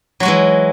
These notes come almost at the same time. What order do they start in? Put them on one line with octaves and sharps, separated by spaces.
F#3 F#4 G#3 E3